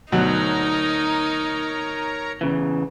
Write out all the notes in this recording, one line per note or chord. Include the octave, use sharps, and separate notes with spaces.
D2 B2 F#3 D#4 A#4 C#5 A#5
E2 C#3 E3